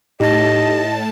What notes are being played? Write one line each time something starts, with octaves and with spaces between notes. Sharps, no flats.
A2 D#4 G4 D#5 A5